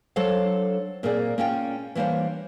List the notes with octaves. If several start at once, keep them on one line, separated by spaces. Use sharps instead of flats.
F#3 D4 A4 C5 C#5 F5
A#2 A#3 C4 G#4 D5
A#3 C#4 F4 G5
E3 G3 A#3 D4 C5 C#5